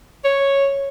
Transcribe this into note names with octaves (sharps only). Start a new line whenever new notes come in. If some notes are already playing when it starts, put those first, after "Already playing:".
C#5